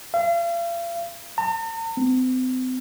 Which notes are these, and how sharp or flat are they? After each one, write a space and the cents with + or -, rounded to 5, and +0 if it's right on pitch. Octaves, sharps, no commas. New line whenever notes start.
F5 -40
A#5 -45
C4 -40